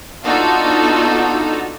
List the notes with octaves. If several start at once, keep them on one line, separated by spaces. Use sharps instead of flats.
B3 D4 D#4 F4 F#4 A4